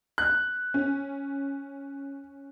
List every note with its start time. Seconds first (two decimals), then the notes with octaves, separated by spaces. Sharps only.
0.18 F#6
0.74 C#4